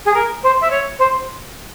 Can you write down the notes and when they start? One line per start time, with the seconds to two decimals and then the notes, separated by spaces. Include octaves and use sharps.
0.05 G#4
0.13 A#4
0.43 C5
0.61 E5
0.70 C#5
0.98 C5